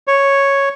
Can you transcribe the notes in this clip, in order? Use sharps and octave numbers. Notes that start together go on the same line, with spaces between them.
C#5